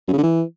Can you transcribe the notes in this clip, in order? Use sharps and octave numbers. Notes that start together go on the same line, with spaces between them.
F#2
C#3
D3
E3